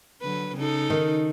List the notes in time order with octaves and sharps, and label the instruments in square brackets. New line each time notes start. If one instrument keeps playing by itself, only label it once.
[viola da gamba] D3 F#3 B4
C#3 D#4 A4
[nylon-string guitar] D#3